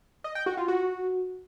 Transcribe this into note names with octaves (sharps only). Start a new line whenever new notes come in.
D#5
G5
F#4
F4
F#4